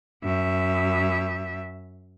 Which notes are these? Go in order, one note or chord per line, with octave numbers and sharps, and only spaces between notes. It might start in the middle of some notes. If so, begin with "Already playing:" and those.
F#2 E5